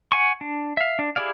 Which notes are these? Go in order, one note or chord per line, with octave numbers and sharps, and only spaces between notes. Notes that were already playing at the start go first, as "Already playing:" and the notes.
F#5 G#5 C#6
D4
E5 F5
D4
E4 G4 G#4 D5 F5